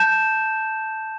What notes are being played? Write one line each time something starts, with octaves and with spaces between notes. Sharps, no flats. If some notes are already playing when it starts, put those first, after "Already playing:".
Already playing: A5 G6 E7